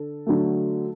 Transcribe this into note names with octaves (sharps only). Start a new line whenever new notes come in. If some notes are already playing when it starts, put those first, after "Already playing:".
Already playing: D3 A4
D3 F#3 A3